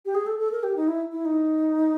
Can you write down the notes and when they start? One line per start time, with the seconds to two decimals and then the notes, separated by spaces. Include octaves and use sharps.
0.06 G4
0.15 G#4
0.27 A4
0.39 A4
0.52 A#4
0.63 G4
0.76 D#4
0.88 E4
1.12 E4
1.25 D#4